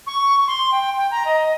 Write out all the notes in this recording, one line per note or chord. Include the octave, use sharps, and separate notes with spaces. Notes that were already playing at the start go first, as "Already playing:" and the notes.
C#6
C6
G5
G5
A#5
D#5